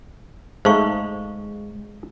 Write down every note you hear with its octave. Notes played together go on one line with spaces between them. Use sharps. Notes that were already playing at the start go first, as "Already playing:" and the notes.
G#2 G#3 A3 D#4 C5 F5 C#6